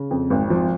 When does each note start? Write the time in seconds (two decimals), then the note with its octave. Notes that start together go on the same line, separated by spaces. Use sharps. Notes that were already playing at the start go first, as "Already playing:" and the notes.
Already playing: C#3
0.11 F2
0.30 G#1
0.50 F3